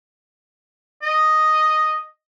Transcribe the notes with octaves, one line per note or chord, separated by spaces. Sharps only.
D#5